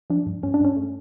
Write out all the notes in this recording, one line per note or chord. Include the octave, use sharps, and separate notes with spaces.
F3 D4
G2
G2 C#4
D4
G2 C#4
A3